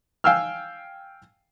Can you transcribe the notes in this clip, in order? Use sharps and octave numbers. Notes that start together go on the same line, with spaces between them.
F5 G5 G#5 E6 F6